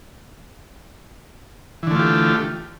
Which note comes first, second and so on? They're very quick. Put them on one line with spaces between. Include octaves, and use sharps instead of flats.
E3 D3 A3 F4 G4